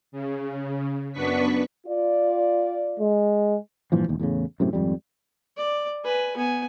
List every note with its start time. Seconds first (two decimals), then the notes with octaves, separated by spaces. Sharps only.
0.12 C#3
1.13 F#2 B3 D4 B4 C#6 B6
1.87 F4 D5
2.99 G#3
3.92 G2 A#2 E3 F3
4.08 E1 D#2
4.20 E2 A2 C#3
4.60 F#2 A2 C3
4.73 G#1 F2 G3
5.57 D5
6.05 B4 G#5
6.37 B3 G#5